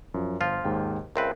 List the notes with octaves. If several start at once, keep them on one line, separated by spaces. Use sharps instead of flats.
F#2 F3
G1 F3 F4
D#2 G#2 G5
C#2 C4 A#4 B4 E5 F5